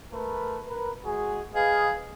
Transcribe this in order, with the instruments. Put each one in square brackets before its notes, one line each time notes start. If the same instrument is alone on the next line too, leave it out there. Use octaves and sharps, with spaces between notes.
[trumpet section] A3 A#4 B4
A#4 B4
G#3 F#4 G#4
[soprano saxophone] G#4 [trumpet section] B4 D#5 F5